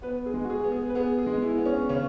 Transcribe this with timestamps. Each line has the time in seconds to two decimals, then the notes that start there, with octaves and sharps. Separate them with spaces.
0.02 B3 B4
0.26 G#4
0.34 G#3
0.44 F#4
0.50 G#4
0.64 B3
0.72 G#4
0.89 B4
0.95 B3 G#4
1.18 G#4
1.26 G#3
1.42 E4
1.58 B3
1.65 C#4
1.89 C#3 C#4